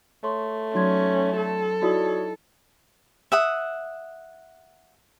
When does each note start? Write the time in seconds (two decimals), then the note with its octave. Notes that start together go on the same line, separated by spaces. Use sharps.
0.24 A3 C#5 C6 C#6
0.74 F#3 C#4 D#4 D5 C6 G#6
1.37 A4
1.82 D#4 E4 F#4 C#5 D5 D#6
3.32 E5 F#5 D#6